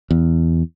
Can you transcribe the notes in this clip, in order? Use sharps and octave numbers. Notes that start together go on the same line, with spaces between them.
E2